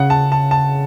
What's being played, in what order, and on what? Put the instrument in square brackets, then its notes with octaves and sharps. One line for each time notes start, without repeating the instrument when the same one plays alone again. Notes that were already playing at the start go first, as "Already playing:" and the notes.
Already playing: [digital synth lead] C#3 [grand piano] F#5
[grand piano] A5
A5
A5